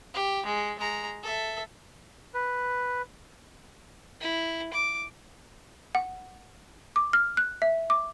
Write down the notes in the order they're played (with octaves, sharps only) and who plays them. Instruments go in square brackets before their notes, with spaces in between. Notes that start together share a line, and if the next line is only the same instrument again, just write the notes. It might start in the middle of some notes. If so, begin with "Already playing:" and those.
[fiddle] G4
G#3
G#3 A#5
A4 E5
[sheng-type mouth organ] B4
[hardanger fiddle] E4
D6
[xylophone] F#5
D6
F6
F#6
E5
D6